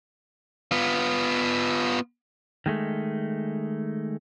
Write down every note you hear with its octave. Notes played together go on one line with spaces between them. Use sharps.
B3 F4
D#3 G#3 A3